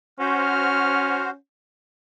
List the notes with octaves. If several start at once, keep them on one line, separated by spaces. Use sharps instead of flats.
C#4 F#4 C5 F6